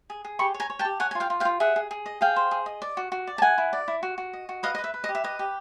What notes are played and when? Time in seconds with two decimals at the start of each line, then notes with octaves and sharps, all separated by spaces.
0.10 G#4
0.25 G#4
0.39 G4 B5 C#6
0.54 C#5
0.60 G#5 A#5
0.70 C#5
0.79 G5 A5
0.85 G4
1.00 C#5 F#5 G#5
1.11 G#5
1.15 F4
1.20 F5 G5
1.30 F4
1.40 F5 G5
1.45 F4
1.60 G#4 E5 F#5
1.76 G#4
1.91 G#4
2.06 D#5
2.21 G#4 F5 G5
2.36 C5
2.51 G#4
2.66 D#5
2.82 D5
2.97 F#4
3.12 F#4
3.27 D5
3.38 A5
3.42 E4 F#5 G#5
3.58 E4
3.73 D5
3.88 E4
4.03 F#4
4.18 F#4
4.33 D#5
4.49 F#4
4.63 B4 D#5 F5
4.75 D#5
4.79 B4
4.84 E5
4.94 B4
5.04 D#5
5.09 G4
5.15 E5
5.24 B4 D#5
5.39 G4